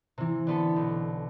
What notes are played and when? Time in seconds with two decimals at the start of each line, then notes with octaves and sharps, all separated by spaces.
0.18 C3 E3
0.47 D3 B3 A4
0.76 B1